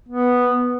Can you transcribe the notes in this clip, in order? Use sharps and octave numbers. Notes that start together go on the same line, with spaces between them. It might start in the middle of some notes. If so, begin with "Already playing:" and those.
B3